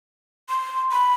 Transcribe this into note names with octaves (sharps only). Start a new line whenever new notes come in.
C6
B5